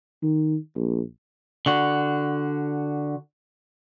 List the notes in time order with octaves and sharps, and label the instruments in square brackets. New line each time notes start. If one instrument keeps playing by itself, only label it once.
[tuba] D#3
A#1
[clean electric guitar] D3 F#4